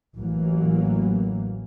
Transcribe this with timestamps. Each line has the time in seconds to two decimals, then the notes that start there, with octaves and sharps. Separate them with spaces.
0.17 A1 E3 F#3 A#3